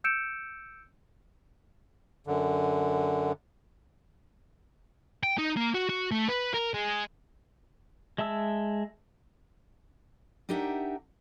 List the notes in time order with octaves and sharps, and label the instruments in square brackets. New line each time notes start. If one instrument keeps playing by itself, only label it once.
[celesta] E6 G6 C#7 D7 E7
[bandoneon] F#2 D3
[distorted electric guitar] G5
D#4
A#3
F#4
F#4
A3
B4
A#4
G#3
[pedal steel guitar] G#3 E5 A5 E6
[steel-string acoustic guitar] D4 D#4 G4 A#4 E5 F#5